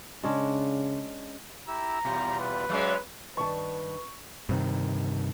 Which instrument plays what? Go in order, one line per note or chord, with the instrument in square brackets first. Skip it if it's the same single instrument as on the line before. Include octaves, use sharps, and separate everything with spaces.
[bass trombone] C#3 [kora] G#3 C#4 D4
[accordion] E4 G4 E6 [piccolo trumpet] A#5
[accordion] E2 G3 F4 [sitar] B2
[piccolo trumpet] B4
[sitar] F#3 G#3 C#4 [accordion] D5 E5 F5
[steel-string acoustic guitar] G2 D#3 A5 [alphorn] B4 [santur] C#6
[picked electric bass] G2 C3 D#3